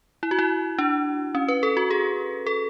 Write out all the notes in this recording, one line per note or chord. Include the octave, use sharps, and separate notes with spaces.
E4
F#4
E4
D4
C#4
B4
A4
F#4
G#4
A4